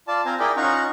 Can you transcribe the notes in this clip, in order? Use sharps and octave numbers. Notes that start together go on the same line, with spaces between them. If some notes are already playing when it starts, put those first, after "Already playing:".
F4 D5 A5
C4 F4 C5 G#5 A#5
E4 G#4 A#4 D5 G5 B5
C#4 D#4 F4 F#5 A#5 C#6